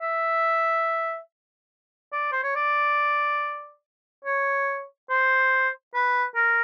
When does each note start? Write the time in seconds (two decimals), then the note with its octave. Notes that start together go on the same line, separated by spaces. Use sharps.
0.01 E5
2.12 D5
2.32 C5
2.43 C#5
2.56 D5
4.25 C#5
5.10 C5
5.94 B4
6.36 A#4